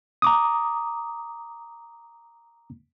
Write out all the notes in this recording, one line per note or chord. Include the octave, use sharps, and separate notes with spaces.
A#5 D6 D#6